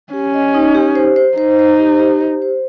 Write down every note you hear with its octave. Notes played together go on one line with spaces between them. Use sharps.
C#4 G4
D#5
D#4
G4
C5
C5
D#4 C5
C5
G4
G4
C5
C5